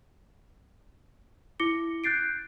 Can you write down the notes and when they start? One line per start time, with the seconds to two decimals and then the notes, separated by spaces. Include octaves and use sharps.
1.60 E4 D6 A#6 C#7 G7
2.04 F#6 G6 A6 C7 D7